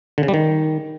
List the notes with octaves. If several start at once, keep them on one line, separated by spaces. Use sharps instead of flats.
D3
C#3
G3
D#3